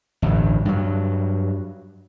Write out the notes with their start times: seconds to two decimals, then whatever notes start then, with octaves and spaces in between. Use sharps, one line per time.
0.22 A1 D2 G2 F#3
0.65 G2 F#3